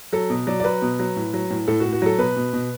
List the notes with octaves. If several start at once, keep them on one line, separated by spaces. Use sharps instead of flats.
F#3 A4
B2
F#3 D5
D5
F#3 B4
B2
F#3
A2
F#3
A2
A2 A4
F#4
A2
F#4
F#3 A4
B2 B4
B2
B2